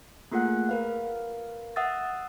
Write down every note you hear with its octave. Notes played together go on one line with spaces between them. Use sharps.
A3 A#3 F4 G#4 F#5 F#6
A#4 B4 F5
E5 F#5 D#6 E6 A6